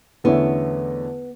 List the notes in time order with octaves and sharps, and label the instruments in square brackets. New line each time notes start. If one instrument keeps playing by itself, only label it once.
[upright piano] E2 D3 A3 C#4 E4 [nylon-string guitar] B3